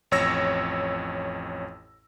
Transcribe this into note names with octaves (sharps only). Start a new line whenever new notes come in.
A1 F2 C#5 E6 A#6